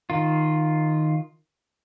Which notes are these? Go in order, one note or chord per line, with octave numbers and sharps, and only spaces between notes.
D#3 F4